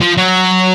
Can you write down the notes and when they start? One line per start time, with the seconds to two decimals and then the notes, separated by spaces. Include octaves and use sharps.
0.01 F3
0.18 F#3